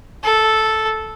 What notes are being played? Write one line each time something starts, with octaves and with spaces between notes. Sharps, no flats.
A4